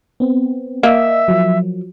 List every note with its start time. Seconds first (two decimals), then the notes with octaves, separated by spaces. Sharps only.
0.20 B3 C4
0.83 A#3 D#5 E5 E6
1.28 F3 F#3